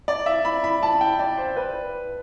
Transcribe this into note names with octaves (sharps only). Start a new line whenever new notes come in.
D5
E5
B5
B5
A5
G5
D5
C5
B4